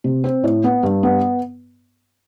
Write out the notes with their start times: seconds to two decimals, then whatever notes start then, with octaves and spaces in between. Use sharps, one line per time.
0.04 C3
0.24 C4
0.44 A2
0.64 B3
0.83 G2
1.03 B3